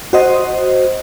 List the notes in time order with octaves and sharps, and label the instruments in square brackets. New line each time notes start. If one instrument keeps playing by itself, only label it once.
[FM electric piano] F#4 C5 D#5